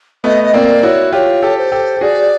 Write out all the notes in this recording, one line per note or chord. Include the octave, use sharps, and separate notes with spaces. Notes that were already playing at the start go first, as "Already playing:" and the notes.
A3 B3 D#5
D#5
A#3 C4 D5
E4 F#4 C#5
F4 G4 C#5
G4 A4
C5
G4 A4
G4
F#4 G#4 D5